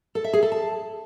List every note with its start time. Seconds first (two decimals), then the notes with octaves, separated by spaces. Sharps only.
0.15 A4
0.24 E5
0.33 G#4
0.43 A4
0.52 A5